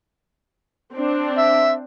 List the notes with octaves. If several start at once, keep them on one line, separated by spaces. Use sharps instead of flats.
C4 D4
E5